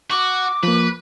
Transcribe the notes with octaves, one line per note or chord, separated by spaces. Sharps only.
F#4 D6
F3 A#3 B4